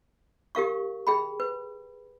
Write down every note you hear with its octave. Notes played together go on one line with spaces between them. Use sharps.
G4 A#4 F5 C#6
G#4 G5 B5
B4